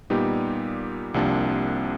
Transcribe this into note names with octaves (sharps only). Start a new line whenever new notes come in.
A#2 G3 B3 D#4 G4
C2 C3 F3 A#3 D4